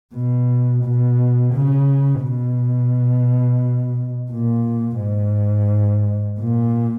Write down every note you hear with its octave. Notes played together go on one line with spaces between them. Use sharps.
B2
B2
C#3
B2
A#2
G#2
A#2